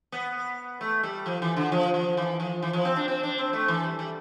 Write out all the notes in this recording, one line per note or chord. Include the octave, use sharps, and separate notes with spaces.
B3
A3
G3
F3
E3
D3
F3
F3
E3
F3
E3
F3
C4
D4
C4
D4
C4
A3
E3
G3
G3